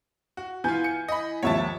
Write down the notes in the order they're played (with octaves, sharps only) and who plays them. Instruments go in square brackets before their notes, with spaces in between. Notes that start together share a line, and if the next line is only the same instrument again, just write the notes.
[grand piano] F#4
[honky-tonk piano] E3 G#5 G6 [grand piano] B3 F4
[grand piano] C#7
D#5 B5
[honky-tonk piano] G#1 D#2 F3 [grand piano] C#5 E5 A5